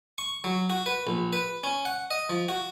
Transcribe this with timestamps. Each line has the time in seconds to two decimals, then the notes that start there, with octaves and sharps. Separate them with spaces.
0.18 C#6
0.44 F#3
0.70 F#4
0.86 B4
1.07 A#1
1.33 B4
1.64 C#4
1.85 F#5
2.11 D#5
2.29 F3
2.49 F#4